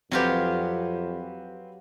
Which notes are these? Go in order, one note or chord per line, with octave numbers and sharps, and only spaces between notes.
F2 F#3 C4 F4 G4 B4